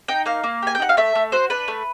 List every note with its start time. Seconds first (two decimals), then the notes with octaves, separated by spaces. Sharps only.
0.08 D#4 G5
0.26 A#3 F5
0.44 A#3
0.62 G4 G#5
0.75 G5
0.80 D#4 F#5
0.89 F5
0.97 A3 E5
1.15 A3
1.32 F#4 C5
1.50 D4 B4
1.68 A3